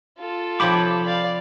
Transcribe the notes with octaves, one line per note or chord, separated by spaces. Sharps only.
F4 A4
C3 F3 G4 C#5 B5 D6
D5 F5